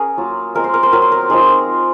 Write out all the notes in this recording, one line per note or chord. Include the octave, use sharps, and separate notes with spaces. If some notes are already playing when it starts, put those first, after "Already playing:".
Already playing: C#4 G#4 A#4
F#3 A#3 F4
F3 G#3 C4 A#4
C5
A#4
C5
F#3 C4 F4 A#4
C5
A#4
F3 C4 D#4 G#4